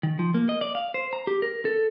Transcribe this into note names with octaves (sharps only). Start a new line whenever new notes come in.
D#3
F3
A#3
D#5
D5
F5
C5
A#5
G4
A#4
A4